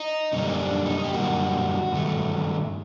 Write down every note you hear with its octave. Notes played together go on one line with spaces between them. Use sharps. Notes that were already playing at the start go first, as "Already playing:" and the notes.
Already playing: D#4
F#2 D3 G3 A#3 D#4
C4
D4
D#4
G4
F#2 D3 G3 A#3 F#4
G2 D#3 A3